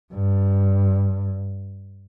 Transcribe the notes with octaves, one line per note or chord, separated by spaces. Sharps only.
G2